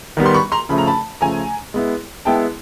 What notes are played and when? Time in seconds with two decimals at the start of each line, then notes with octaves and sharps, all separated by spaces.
0.17 D#3 G3 B3
0.26 C6
0.34 B5 C#6
0.52 A#5 C6
0.69 C#3 F3 A3 B5
0.78 A#5
0.87 A5 B5
1.21 C#3 F3 A3 G#5 A#5
1.74 G#3 B3 E4
2.25 G#3 B3 E4 G5 A5